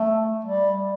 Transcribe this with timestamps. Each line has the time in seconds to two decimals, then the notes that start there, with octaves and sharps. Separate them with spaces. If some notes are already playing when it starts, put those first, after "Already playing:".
Already playing: A3
0.45 G3